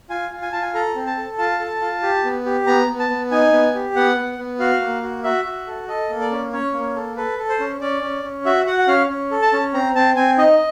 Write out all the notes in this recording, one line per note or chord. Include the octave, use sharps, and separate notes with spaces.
F4 G#5
F4
G#5
F4 A5
G#5
A4 A#5
C4
A5
A4
F4 A5
A4
F4
G4
B3
G4
B3 A#5
B3
A5
B3
D#4 G#5
B3
G4
B3 F#5
B3
B3
F#4 F5
A#3
F#4
F#4 E5
F#4
A4
A4 D#5
A#3
D5
C#4
C#4 C#5
A#3
A4
A4 B4
A4
C5
C#4
C#4 D5
C#4
C#4
F#4 E5
F#4 F#5
F#5
C#4 F5
C#4
A4
A5
C#4
C4 A#5
C4 A5
C4 G#5
D#4 D#5